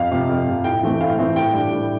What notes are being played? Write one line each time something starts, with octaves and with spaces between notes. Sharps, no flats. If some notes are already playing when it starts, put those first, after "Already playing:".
Already playing: F2 F5
C3 F3
F2
C3 F3
A2 G5
E3 A3 C4
A2 F5
E3 A3 C4
A2 G5
G3 D4
A2